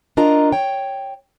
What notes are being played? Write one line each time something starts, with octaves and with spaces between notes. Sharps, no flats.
D4 F4 A#4 D#5 A#5
C#5 G5